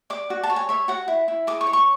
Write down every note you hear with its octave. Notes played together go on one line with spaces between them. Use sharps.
D5 D6
F#4
A5
C#5
G#5
C#5 E5
F#4 F#5
E4
E4
G#4 D6
C#6
C#5
C#6